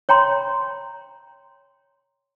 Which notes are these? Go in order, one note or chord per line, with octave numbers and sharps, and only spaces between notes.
C#5 G5 A#5 C6